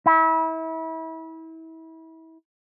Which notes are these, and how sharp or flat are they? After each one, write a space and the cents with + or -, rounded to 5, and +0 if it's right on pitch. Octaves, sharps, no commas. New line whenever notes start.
E4 -30